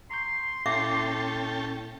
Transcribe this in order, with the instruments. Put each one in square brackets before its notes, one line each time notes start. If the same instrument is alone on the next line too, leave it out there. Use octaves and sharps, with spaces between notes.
[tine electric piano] A#5 C#6 G6 [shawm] C6
[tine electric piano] A#2 E4 [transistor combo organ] C#4 A4 G5 [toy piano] E5 D6